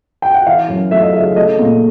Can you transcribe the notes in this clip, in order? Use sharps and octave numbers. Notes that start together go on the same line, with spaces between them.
G5
F#5
E3 F5
F#2
A3 E5
D#5
C#3 E5
A3 D#5
A#2